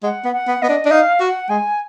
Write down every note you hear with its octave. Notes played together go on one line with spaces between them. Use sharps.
G#3 F#5
B3
F#5
B3
B3 D#5
D4
D4
D#4 F5
F#4 F#5
G#3 G#5